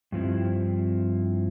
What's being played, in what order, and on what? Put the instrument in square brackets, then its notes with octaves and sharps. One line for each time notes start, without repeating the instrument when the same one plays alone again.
[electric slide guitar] G2 F3 C4 E4